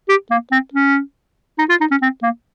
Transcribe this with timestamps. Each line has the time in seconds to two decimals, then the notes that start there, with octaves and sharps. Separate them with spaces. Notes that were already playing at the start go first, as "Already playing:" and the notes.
0.09 G4
0.30 A#3
0.51 C4
0.73 C#4
1.59 D#4
1.69 F4
1.80 D#4
1.91 C#4
2.01 C4
2.22 A#3